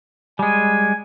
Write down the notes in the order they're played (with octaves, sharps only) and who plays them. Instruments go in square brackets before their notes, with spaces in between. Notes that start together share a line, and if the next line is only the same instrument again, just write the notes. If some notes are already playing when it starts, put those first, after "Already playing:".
[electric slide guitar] G3 G#3 [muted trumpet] G#5